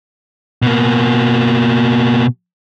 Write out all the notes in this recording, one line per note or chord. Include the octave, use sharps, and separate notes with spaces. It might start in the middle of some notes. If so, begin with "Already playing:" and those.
B2 A#3